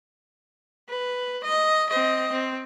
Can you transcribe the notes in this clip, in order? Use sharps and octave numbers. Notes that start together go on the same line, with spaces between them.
B4
D#5
C4 D#5
C4